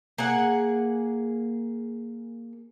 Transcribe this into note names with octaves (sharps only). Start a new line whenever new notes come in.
A#3 G#4 F#5